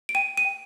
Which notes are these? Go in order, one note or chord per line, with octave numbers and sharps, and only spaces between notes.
D7
G5 D#7
D#7
G5